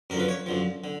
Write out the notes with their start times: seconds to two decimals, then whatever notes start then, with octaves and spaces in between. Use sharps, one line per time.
0.10 F#2 D3 F3 A#4
0.20 B4
0.28 C#5
0.46 F#2 D3 F3
0.84 D3